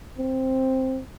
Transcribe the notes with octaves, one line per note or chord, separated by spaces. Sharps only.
C4